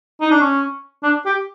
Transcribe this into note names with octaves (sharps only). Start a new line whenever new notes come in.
D#4
D4
C#4
D4
G4